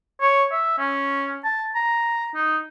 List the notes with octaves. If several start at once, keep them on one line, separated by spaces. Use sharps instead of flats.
C#5
E5
C#4
A5
A#5
D#4